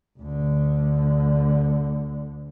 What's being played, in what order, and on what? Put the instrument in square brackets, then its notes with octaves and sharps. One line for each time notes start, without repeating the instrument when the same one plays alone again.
[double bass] D2 D3